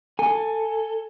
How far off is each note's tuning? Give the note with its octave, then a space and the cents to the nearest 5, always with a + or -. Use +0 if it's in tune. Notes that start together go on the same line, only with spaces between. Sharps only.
A4 +15 G#5 +0